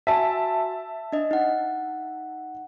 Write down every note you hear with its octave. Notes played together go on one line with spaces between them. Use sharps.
F#4 E5 G#5 A5 B6
D4 D#5
D#4 F#5